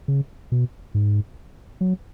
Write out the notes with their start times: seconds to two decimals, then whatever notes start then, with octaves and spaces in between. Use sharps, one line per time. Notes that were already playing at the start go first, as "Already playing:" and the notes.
0.08 C#3
0.52 B2
0.94 G#2
1.81 F#3